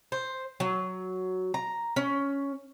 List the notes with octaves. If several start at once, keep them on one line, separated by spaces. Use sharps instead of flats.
C5
F#3
A#5
C#4